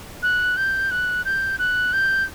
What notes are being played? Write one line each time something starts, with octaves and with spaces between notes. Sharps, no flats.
F#6
G6
F#6
G6
F#6
G6